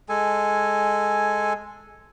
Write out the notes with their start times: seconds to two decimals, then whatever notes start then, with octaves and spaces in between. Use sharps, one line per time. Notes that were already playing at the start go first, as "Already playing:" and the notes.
0.09 G#3 A4 G#5